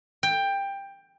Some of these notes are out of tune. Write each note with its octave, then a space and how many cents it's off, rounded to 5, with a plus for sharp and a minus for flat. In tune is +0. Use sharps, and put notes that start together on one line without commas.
G5 +15